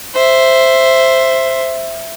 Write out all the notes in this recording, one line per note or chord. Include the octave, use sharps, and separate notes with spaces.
C5 E5